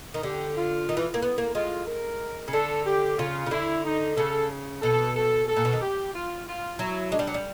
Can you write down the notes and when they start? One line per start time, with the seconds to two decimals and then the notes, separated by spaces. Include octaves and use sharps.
0.14 D#3
0.23 D3 G4
0.57 F4
0.89 D#3
0.97 E3
1.14 A#3
1.22 B3
1.38 A#3
1.55 G#3 F4
1.87 A#4
2.48 C#3
2.53 D3 A4
2.86 G4
3.19 C#3 F4
3.46 C#3
3.51 D3 E4
3.85 D#4
4.17 C#3 A4
4.82 B2 A4
5.15 A4
5.48 A4
5.56 A#2
5.65 B2
5.73 D#3
5.81 G4
6.14 F4
6.47 F4
6.79 F#3 E4
7.11 G#3 D4
7.19 G3
7.27 F#3
7.34 G3